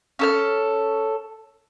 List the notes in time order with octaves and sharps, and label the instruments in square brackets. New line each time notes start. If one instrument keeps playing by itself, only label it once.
[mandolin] C#4 A4 F6